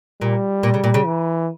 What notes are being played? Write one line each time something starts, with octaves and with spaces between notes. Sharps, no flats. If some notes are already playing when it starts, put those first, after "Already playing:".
A#2 G3
A#2
C#3
A#2
C#3
E3